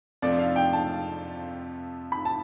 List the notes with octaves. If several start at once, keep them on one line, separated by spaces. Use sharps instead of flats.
F2 C3 F3 A3 D4 D5
F5
G5
A5
B5
A5